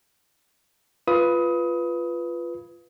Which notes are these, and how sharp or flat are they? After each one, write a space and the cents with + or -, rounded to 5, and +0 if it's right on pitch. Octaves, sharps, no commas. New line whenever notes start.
F4 -10 B4 +0 D#6 +25